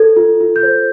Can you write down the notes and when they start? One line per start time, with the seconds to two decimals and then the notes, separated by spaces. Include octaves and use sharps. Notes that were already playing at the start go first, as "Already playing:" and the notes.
Already playing: A4 G#6
0.16 F4
0.41 F4
0.56 G6
0.63 C5